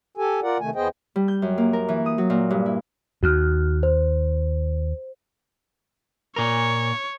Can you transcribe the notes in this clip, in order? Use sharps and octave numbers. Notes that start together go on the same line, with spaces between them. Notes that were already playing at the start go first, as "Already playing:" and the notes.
G4 A4 G#5
F4 A#4 D5 F#5
C3 D#3 A3 G#5
E2 B3 G#4 C5 D#5 G5
G3
G6
F#2
A#3
A#4
E3
D#6
F#3
A#2
G2
E4
D#2 F#4 F6
C5
A#2 A#4 C#5